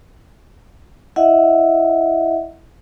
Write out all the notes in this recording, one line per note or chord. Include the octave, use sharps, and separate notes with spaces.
E4 D#5 E5 F#5